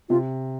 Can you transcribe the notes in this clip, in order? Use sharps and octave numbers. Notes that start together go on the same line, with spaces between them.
C3 F4